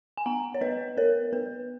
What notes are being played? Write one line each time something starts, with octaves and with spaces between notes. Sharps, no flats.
G#5
B3 F#5 A#5
C#5
B3 B4 D#5
B3 A#4 C#5
B3 B4